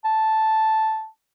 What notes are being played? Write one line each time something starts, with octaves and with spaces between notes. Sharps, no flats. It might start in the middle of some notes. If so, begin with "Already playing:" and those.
A5